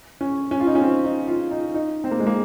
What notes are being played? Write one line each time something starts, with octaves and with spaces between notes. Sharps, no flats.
C#4
C#4
F4
D#4
C#4
C4
D#4
F4
D#4
D#4
C4
A#3
G#3
A#3